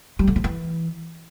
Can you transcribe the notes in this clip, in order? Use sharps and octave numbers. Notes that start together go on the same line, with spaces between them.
G3
D3
F3
E3